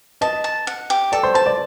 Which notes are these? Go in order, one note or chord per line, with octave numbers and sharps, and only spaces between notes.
D#5 A5
A5
F#5
G4
A4 D5
C5
C5 A5
D5